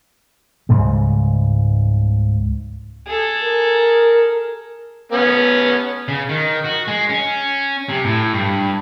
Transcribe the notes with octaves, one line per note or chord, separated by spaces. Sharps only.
C#2 G#2 C#3 G3
G#4 A4
A#4
B3 C#4
C#3
D#3
F#4
G#3
C#4
C3
A2
G2